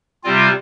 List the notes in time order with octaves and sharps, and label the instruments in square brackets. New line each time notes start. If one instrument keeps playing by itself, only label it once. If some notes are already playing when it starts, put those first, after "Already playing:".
[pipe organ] C3 G3 C4 F4